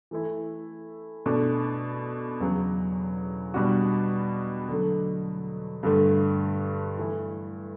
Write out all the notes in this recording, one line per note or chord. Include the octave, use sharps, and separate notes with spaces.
E3 A3 E4
B2 A3 D4
E2 C#3 F#3
B2 G3 D4 F#4
D3 F#3 A3
G2 D3 A3
E3 A3 E4